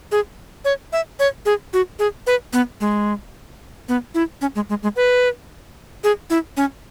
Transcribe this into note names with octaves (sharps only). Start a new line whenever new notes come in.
G#4
C#5
E5
C#5
G#4
F#4
G#4
B4
B3
G#3
B3
E4
C#4
G#3
G#3
G#3
B4
G#4
E4
C#4